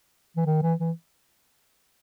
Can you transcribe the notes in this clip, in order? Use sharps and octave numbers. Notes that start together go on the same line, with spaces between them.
E3
D#3
E3
E3